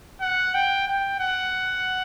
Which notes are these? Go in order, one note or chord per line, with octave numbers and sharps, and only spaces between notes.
F#5
G5
G5
F#5